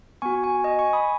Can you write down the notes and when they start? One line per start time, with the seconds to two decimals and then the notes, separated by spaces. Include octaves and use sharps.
0.22 B3 F#4 G#5 C#6
0.43 G#5 C#6
0.64 D#5 G#5
0.79 G#5 C#6
0.93 B5 D#6